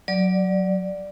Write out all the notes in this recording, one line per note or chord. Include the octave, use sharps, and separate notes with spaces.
F#3 D5